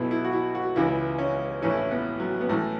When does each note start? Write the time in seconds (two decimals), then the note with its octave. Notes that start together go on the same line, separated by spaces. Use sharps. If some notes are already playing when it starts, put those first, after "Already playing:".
Already playing: B1 B2 E4
0.11 E4
0.24 F#4
0.33 E4
0.55 F#4
0.76 C#2 C#3 E3 E4
1.19 C#4
1.62 A1 A2 E3 C#4
1.70 E4
1.77 C#4
1.91 B3
2.20 F#3
2.41 B3
2.49 A1 A2 E3 A3